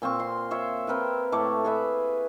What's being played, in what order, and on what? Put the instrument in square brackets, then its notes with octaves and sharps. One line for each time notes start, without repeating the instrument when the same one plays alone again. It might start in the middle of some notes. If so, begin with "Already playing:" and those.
[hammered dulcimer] A#2 C4 F4 C#6
C6
C5 C#5 E5
C4 A#4 B4 G5
A2 A3 C#5 D6
G#4 B4 E5